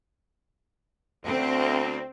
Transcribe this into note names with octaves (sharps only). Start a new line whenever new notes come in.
D2 C4